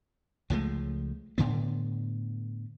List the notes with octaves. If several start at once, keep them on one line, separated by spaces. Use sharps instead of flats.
C#2 F3 G#3 A3
A2 D3 B3